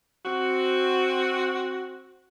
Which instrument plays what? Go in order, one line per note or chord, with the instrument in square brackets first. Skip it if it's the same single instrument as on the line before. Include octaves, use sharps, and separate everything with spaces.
[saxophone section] C4 F#4